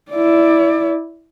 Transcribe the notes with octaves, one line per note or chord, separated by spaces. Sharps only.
E4 D5